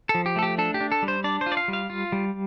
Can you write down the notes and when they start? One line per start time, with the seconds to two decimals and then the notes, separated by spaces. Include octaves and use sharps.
0.09 A4
0.15 F3
0.26 G4
0.36 A3 A4
0.43 G4
0.58 D4 A4
0.74 G4
0.81 D4
0.92 A4
1.03 G3
1.08 C5
1.24 D4 D5
1.41 C5
1.46 F4
1.52 D5
1.57 F5
1.68 G3
1.73 F5
1.90 F4
2.12 G3